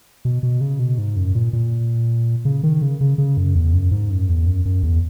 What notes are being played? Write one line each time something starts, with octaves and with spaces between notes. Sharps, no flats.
B2
B2
C#3
B2
G#2
F#2
A#2
A#2
C#3
D#3
C#3
C#3
C#3
F#2
E2
F#2
G#2
F#2
E2
F#2
F#2
E2